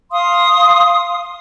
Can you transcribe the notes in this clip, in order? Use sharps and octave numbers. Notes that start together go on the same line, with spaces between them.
F5 C6 D#6